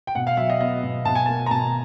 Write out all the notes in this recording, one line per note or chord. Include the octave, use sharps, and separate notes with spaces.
G5
B2 F#5
F5
F#3 E5
D#5
B3 D#5
B2
B2 A5
G#5
A#3 A5
A#5
B2 A5